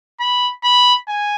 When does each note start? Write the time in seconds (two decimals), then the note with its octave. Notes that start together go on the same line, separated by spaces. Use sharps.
0.20 B5
0.64 B5
1.08 G#5